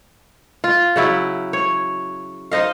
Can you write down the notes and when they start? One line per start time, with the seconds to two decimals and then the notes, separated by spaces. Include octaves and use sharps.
0.64 F4
0.96 C#3 F#3 E4
1.53 C#5
2.51 D#4 C5 D#5 F5